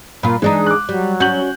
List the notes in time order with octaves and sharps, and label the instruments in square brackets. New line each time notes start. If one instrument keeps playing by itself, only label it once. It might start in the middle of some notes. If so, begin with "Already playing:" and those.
[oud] A#2 F4 [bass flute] A#3 [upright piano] B5
[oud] E3 D4 D#4 [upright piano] G#3 [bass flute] G#4
[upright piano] D6 F#6
[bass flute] F#3 [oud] G3
[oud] C#4 F#4 [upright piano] G6 F#7